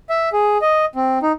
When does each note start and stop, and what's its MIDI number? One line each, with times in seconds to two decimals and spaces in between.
0.10 0.29 76
0.33 0.58 68
0.62 0.85 75
0.95 1.19 60
1.22 1.32 63